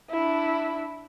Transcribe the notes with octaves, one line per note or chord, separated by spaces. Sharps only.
D4 E4